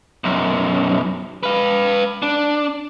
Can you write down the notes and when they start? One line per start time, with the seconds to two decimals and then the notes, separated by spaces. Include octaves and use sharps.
0.24 B1 F#2
1.43 B4 F5
2.23 D4